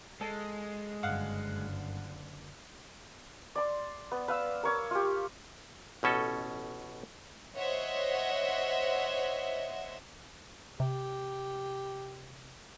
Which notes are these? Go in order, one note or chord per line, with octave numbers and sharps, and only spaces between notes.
G#3 A4
F#1 G2 D3 F5 F#5
D5 C6
B3
B4 F5 E6
A#4 C#5 D6
F4 G4
A1 B2 C#4 A4
C5 C#5 D#5 E5 F#5
C3 G4